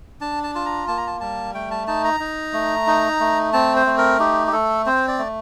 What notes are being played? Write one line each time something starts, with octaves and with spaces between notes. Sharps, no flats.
D4 A5
A5
F4 A5
A#5
A#3 A5
A#5
A5
G3 A5
A3 G5
A5
D#4 A5
A#5
D#4
A3
D#4
A3
C4 A5
C5
A3
A#4
D#4 G4
G4
A3 A4
C4 C5
D5
A3